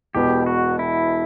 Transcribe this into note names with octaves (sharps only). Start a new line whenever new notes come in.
E1 E2 B2 G4
F#4
E4